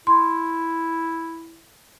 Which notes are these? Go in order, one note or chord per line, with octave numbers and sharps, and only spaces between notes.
E4 C6